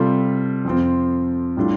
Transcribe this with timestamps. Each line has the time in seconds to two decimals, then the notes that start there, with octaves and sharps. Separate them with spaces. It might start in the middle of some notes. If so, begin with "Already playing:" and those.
Already playing: C3 G3 F4 A4
0.65 F2 F3 C4
1.57 A2 G3 D4 F4